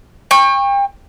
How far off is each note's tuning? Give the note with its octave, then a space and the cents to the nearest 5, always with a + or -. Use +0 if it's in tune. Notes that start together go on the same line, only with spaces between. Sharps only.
G5 +35 C#6 -15